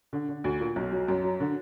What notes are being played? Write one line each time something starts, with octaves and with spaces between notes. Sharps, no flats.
D3
D3
D2
A#2
B1
F#3
F#2
F#3
D3